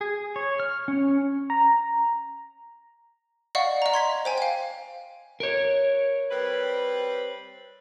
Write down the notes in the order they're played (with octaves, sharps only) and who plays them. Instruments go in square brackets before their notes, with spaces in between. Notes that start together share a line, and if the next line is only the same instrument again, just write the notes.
[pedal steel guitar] G#4
C#5
F6
C#4
[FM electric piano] A#5
[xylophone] D5 D#5 F5 F#5 C#6
D#5 A#5
C6 G#6 B6
C5 G5 G#5
F5 G5
[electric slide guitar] A#4 C#5
[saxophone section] G3 C4 B4